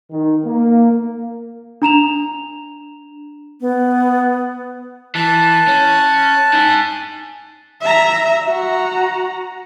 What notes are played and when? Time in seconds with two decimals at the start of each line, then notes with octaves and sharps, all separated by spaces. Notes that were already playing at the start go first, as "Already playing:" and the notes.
0.11 D#3
0.45 A#3
1.82 D4 A#5 E7 F7
3.61 B3
5.15 E3 A5 F#6
5.67 C#4
6.53 D#4 G#5
7.82 E5 A#5
8.46 F#4 A#5